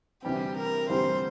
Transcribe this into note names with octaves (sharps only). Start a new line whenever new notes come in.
D2 C3 E3 G3 C4 G4
A#4
D2 C3 E3 G3 C4 C5